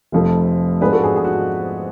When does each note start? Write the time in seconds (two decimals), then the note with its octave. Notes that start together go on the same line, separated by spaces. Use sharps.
0.12 F1 F2 F3 A3
0.81 G#2 F3 B3 D4 G#4 B4
0.93 F#4 A4
1.04 G#4
1.16 G#4
1.25 F#4